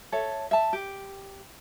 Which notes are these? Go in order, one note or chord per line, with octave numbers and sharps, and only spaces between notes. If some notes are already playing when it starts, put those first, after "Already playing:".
A4 C#5 E5
E5 A5
G4